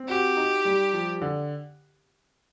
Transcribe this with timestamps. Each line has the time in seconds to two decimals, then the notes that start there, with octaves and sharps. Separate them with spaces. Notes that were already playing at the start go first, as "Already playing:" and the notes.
Already playing: C4
0.08 F#4 G4
0.37 D#4
0.65 G3
0.93 F3
1.22 D3